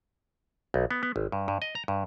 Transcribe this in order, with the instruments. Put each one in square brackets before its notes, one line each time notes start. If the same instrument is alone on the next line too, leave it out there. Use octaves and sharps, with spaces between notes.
[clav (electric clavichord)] B1
B3
B3
G#1
G2
G2
D#5
A#5
G2